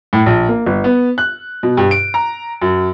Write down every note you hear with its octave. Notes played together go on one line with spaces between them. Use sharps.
A2
A#1
A#3
G1
B3
F#6
B2
G2
D7
A#5
F#2